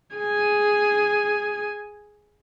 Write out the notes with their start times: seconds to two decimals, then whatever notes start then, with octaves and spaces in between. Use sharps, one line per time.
0.17 G#4 G#5